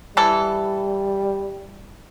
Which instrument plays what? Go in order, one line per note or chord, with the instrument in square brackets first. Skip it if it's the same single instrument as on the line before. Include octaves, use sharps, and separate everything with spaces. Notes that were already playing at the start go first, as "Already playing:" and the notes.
[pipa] E3 A4 [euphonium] G3